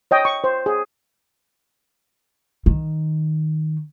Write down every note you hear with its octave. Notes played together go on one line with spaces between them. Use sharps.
C#5 D#5 G5
C#6
C5
G#4
D#3